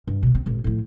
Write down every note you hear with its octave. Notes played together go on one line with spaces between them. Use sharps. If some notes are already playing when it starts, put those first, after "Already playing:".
G2
B2 A#3
C4
G#1 A#2
A2 F3